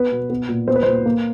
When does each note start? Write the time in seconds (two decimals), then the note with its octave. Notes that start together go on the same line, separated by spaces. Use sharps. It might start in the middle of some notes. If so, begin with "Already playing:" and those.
Already playing: B3 B4
0.11 B2
0.30 B3
0.48 A#2
0.68 B3 C5
0.76 B4
0.83 A#2 C5
1.06 A#3